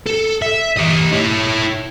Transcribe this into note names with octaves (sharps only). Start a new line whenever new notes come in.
A4
E5
G4 D#5
E4 C#5